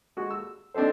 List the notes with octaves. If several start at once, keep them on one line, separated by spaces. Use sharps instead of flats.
G#3 F#4
E6
C4 D4 D#4 A4 C5